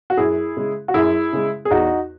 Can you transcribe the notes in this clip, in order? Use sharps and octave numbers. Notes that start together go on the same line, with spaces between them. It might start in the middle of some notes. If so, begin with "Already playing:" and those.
F#4
F#2 E4 G#4
C#3 G#3
F#4
F#2 E4 G#4
C#3 G#3
G#4
E2 D#4 F#4